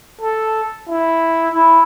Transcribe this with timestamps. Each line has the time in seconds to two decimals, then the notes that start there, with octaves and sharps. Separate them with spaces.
0.21 A4
0.88 E4
1.52 E4